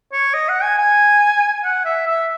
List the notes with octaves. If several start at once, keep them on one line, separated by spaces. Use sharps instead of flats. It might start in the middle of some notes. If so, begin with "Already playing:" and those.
C#5
D#5
F#5
G#5
G#5
F#5
E5
E5